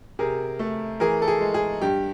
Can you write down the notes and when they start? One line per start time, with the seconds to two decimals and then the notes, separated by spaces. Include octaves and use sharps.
0.19 C3 G#4 A#4
0.59 A3
1.00 E3 G#4 A#4
1.22 A4
1.28 G#4
1.41 G#3
1.54 G#4
1.81 G2 G4